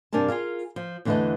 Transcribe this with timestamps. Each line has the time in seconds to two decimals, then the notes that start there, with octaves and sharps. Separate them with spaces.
0.13 G2 C3 D4 A#4 G#5 A5
0.28 F4 G#4 A#4 F5
0.76 F3
1.05 E2 D3 E3 A3 B4 D#5